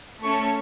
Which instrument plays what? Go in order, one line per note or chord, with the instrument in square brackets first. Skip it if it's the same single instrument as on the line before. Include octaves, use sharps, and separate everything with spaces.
[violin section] A3 C#4 A4 C#6